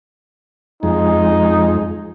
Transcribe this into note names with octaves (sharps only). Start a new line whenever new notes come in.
F2 G#3 D#4